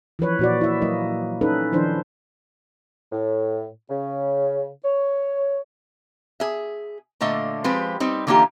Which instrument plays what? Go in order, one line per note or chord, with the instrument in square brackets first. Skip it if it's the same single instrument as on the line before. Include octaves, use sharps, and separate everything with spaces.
[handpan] E3 F3 B4 C#5
A#2 F#4 D5
E4 E5
F#3 A#3 E4 D#5
C#4 D#4 A4 B4
D#3 F3 D4 E4 C5
[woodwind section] A2
C#3
C#5
[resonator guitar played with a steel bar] G#4 E5
A#2 D3 A3 D#5 F5
F3 G#3 C4 G4 B4
G3 C4 D#4
D3 E3 A#3 D#4 F4 G4